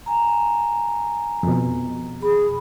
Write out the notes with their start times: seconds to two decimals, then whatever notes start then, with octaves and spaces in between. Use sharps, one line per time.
0.06 G#5 A#5
1.43 F2 B2
2.22 G#4 B5